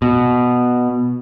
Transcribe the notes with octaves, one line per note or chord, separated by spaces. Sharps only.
B2